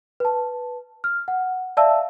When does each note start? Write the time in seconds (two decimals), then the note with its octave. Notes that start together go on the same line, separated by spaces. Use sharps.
0.20 B4 A5
1.04 F6
1.28 F#5
1.77 D5 E5 F5 A5 E6